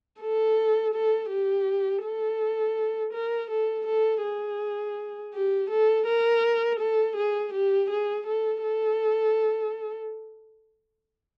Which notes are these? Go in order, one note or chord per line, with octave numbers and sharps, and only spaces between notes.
A4
A4
G4
A4
A#4
A4
A4
G#4
G4
A4
A#4
A4
G#4
G4
G#4
A4
A4